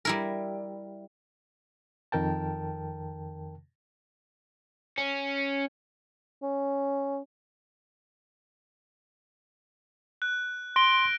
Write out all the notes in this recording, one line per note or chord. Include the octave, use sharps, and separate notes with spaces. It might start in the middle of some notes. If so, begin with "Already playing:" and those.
G3 E4 A#4
F2 D#3 A#4 G5 A5
C#4
C#4
F#6
C6 A#6 D7 G7